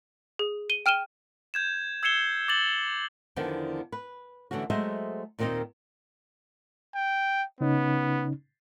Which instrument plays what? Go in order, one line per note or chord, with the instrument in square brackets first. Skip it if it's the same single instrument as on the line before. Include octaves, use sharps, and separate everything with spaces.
[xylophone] G#4
D#7 G7
G5 F6 D#7 E7 G7
[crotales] G6 G#6 E7
E6 G#6 C7 C#7 E7 G7
D6 A6 F#7
[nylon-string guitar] E2 D3 D#3 F3 B3 D4
B4
D3 E3 A3 C#4 F#4
F#3 G#3 A3 C5 D#5 E5
D#2 A#2 D#3 C4 D#4 D#5
[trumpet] G5
[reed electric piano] C#3 C#4 D#4 [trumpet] B3